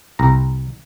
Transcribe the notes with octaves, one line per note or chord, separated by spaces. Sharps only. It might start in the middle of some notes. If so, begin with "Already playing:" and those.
C2 A#5